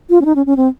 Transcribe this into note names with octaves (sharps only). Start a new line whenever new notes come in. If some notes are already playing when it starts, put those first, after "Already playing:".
F4
C#4
D#4
C#4
C#4
C4